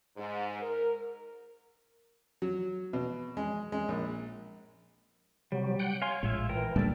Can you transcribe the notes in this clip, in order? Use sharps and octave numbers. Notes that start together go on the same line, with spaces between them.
G#2
A#4
F#3
B2
G#3
G#3
A#1
C3 F#3 G3
F#5 G5
C#5 F5 G#5 C6
A#1 A2 G#3 F4 E5
E3 A#4 G5
D2 A#2 D#3 G3 A3 D4 A4 D5